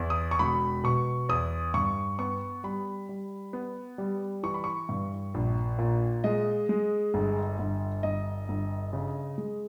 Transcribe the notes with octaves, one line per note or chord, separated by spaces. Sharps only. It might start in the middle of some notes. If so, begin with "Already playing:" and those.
Already playing: E2
D#6
C#6
E1 B5
B2 C#6
E2 D#6
G2 C#6
B3 C#6
G3 B5
G3
B3
G3
E3 C#6
B5
C#6
G2
A#1
A#2
G#3 D#5
G#3
G1
G1
G1 D#5
G1
C#3
G#3